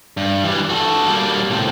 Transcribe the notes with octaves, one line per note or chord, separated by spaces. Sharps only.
G2
E3 G3
F#4 A4
G3 A#3
A2 C3